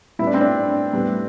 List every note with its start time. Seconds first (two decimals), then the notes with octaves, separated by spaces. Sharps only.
0.19 A2 G3 B3 E4
0.27 D4
0.34 C4
0.41 D4
0.93 A2 G3 B3